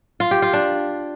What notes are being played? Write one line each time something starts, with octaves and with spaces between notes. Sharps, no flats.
F4
G4
F4
D4